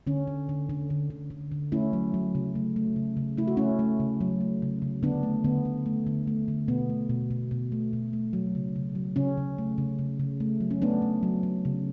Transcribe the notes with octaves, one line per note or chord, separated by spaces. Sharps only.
D3 C#4
D3
D3
D3
D3
D3
D3
D3
A3 C#4 E4
F#3
F#3
C#3
A3
A3
C#3
C#3
A3 E4
F#4
A3 C#4 E4
A3
C#3
F#3
A3
C#3
C#3
D3 B3 D4
A3
D3 B3
D3
A3
D3
A3
D3
B2 B3
A3
B2
B2
B2
A3
B2
A3
F#3
C#3
C#3
F#3
C#3 C#4
C#3
A3
C#3
C#3
C#3
A3
F#3
C#4
A3 B3 D4
A3
F#3
F#3
C#3